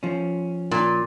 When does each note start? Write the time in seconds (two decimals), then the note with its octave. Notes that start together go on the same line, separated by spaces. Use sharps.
0.03 F3 C#4
0.71 A#2